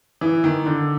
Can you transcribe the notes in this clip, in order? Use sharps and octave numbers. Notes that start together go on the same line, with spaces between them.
E3
D#3
D3